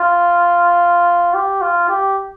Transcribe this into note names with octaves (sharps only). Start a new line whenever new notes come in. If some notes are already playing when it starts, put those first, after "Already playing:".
Already playing: F4
G4
F4
G4